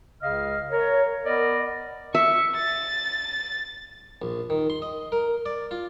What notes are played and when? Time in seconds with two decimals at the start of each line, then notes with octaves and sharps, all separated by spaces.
0.22 C#2 C#3 D#5 F5 F6
0.71 A#4 C#5
1.25 B3 A#4 D5 D#5
2.15 E5 C#6
2.56 A6
4.22 A#1
4.50 D#3
4.70 C6
4.82 D#5
5.12 A#4
5.46 D5
5.71 F4